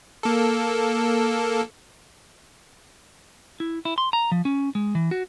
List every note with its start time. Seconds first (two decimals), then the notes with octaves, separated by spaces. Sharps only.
0.23 A#3 A4
3.60 E4
3.85 E4
3.98 C6
4.13 A#5
4.32 F3
4.45 C#4
4.75 G#3
4.95 E3
5.11 F#4